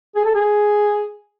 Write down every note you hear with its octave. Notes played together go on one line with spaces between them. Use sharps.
G#4
A4
G#4